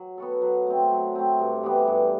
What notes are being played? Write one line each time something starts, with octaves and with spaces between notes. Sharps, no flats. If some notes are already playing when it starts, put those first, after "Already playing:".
Already playing: F#3
B3 F#4 A4
F#3
A3 C4
F#3
A3 C4
G2
E3 G3 B3
G2